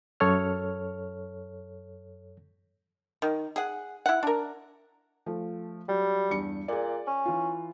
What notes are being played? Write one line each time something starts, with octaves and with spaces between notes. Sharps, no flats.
F#2 A4 C#5 F6
D#3
G#4 F#5
E4 F#5
D4 A#4
F3 A3
F#3 G3
E2 G2 C#7
A#2 G#4 D5
C#4
E3 F4